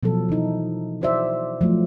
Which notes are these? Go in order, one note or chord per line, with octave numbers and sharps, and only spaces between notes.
B2 F3 F#3 A4
E3 F#3 D#4 E4
E4 F#4 C5 D5 E5
F3 F#3 A3